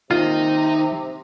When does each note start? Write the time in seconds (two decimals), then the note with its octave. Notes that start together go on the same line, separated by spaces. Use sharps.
0.11 C3 D#3 A#3 C4 D#4 F4